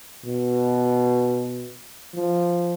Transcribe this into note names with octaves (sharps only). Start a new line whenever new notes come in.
B2
F3